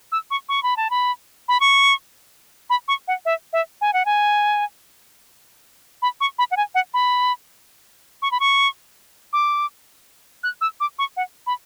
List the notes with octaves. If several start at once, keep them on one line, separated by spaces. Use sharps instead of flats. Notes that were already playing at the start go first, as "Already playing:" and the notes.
E6
C#6
C#6
B5
A5
B5
B5
C#6
B5
C#6
F#5
E5
E5
G#5
F#5
G#5
B5
C#6
B5
F#5
G#5
F#5
B5
C#6
B5
C#6
D6
F#6
E6
D6
C#6
F#5
B5